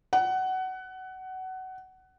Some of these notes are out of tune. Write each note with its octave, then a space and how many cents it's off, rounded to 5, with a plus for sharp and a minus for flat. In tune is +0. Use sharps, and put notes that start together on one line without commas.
F#5 +20